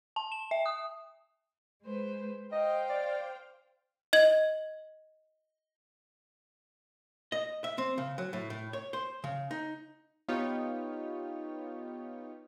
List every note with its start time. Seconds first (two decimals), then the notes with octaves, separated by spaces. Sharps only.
0.16 A5
0.32 E7
0.51 E5
0.66 D#6
1.84 G#3 B4 C5
2.52 C5 D#5 F5 G5
2.90 D5
4.13 D#5 G#6 F#7
7.32 D#5
7.64 E5
7.78 C4
7.98 C#3
8.18 F#3
8.33 A2
8.50 A2
8.73 C#5
8.93 C5
9.24 C#3
9.51 D#4
10.28 B3 D#4 F4 G4 C#5